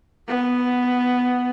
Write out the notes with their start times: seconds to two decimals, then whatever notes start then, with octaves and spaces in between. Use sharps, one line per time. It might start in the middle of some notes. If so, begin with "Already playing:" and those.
0.28 B3